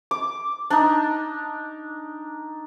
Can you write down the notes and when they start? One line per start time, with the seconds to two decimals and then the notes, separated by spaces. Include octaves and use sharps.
0.11 D6
0.70 D4 D#4